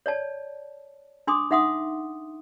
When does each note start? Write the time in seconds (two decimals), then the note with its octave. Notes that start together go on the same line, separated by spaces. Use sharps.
0.06 C#5 D5 A5
1.27 D4 G#5 C6 D6 D#6
1.51 D#4 E5 F#5 C6 D#6